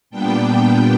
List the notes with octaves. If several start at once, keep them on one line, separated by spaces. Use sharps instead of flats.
A#2 G3 B3 D4 G5